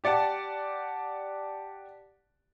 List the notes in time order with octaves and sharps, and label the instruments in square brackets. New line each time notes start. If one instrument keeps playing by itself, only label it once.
[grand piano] G4 D5 F#5 A5